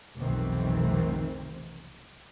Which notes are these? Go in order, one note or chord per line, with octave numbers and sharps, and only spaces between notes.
F1 B1 B2 D#3 E3 C4